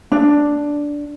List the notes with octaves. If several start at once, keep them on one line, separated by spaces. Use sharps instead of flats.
D4